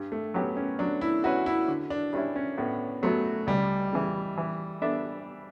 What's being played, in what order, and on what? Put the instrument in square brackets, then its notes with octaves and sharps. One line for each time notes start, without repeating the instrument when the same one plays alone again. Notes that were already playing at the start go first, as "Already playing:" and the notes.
Already playing: [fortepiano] G2
[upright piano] A3
[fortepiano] F#3 C#4 G4 [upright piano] B3
[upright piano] C#4
[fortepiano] F#3 [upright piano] D4
[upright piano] E4
[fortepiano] C#4 E4 B4 E5 [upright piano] F#4
[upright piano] E4
[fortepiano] D3
[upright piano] D4
[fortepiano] G3 C#4 E4 [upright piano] D4
[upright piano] C#4
[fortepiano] A2 [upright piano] B3
[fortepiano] F#3 B3 F#4 C#5 [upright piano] A3
[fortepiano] C#2 [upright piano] G3
[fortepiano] C#3 E3
E3
B3 D4 A4 E5